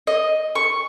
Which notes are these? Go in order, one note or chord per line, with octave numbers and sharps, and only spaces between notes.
D#5
C#6